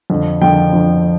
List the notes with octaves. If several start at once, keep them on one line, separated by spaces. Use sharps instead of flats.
F2 D3 F3
F2 D3 F3 G5
F2 D3 F3